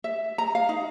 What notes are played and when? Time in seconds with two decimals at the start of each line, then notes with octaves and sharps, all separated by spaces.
0.04 E5
0.38 A#5
0.55 F5
0.69 D#4